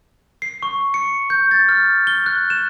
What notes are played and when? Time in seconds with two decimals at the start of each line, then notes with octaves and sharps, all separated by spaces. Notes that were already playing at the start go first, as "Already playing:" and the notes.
0.42 C7
0.63 C#6
0.94 C#7
1.30 G6
1.51 A6
1.69 F6
2.07 G7
2.26 F#6
2.50 E7